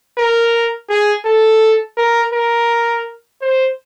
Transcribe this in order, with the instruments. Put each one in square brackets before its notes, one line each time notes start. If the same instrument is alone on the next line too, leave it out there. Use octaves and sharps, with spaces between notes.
[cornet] A#4
G#4
A4
A#4
A#4
C5